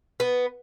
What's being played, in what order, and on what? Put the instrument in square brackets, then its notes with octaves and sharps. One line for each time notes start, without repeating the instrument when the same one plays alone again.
[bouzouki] B3